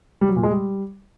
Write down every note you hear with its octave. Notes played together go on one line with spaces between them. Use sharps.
G3
F#3
A#2
G#3
G3